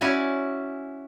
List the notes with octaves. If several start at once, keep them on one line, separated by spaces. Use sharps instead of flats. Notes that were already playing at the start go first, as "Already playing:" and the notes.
C#4 E4 F#4 D5 G#5